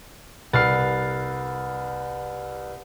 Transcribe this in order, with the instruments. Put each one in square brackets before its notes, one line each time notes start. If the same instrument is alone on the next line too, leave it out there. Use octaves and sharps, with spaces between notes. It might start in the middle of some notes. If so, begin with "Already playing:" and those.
[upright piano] C2 F6 C7 [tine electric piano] B4 A6